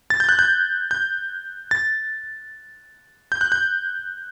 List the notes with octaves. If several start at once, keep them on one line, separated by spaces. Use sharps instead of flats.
A6
G6
F#6
G6
G6
A6
G6
F#6
G6